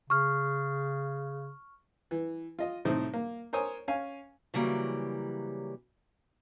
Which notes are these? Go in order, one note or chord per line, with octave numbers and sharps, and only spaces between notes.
C#3 C#6 F6
E3
F4 D#5
A2 C3 D#4 C5
A#3
A#4 C5 C#5 G#5 D#6
C#4 F5 G#5
C#3 E3 F#3 G3 A#3